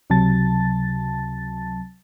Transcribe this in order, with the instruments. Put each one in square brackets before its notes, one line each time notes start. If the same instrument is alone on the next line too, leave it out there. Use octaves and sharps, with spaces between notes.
[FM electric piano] C#2 C3 F#3 A5 A6